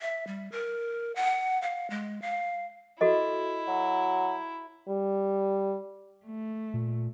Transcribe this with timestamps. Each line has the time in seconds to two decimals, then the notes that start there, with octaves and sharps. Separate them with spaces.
0.01 E5
0.27 G3
0.52 A#4
1.16 F#5
1.62 F5
1.90 G#3
2.22 F5
3.01 E4 F#4 A4 D#5
3.67 F#3
4.88 G3
6.25 A3
6.74 A#2